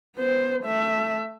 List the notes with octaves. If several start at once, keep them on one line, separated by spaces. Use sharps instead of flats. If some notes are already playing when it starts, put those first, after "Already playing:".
B3 C5
A3 E5